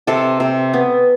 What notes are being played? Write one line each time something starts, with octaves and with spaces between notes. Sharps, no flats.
C3 A4
C3
B3